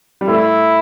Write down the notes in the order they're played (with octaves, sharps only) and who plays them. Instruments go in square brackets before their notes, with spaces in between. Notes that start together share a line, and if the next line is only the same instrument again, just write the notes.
[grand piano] G3
[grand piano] A3 [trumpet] E4